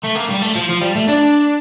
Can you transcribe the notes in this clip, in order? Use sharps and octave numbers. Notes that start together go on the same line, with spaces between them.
A3
A#3
G3
A3
F3
F3
G3
A3
D4